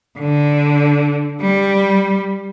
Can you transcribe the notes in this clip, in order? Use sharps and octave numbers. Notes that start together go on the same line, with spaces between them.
D3
G3